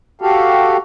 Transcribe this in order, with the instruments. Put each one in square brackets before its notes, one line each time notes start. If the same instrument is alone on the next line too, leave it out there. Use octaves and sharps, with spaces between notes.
[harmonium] F#4 G4 A4 F5